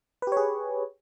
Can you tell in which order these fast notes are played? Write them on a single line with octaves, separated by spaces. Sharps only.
B4 G4 C#5 G#4